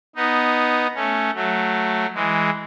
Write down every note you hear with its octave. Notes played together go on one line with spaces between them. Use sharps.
B3 D#4
A3 C#4
F#3 A3
E3 G#3